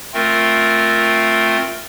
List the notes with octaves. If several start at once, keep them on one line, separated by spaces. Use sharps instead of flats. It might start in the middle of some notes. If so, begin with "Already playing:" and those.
A3 C4 F4 A#4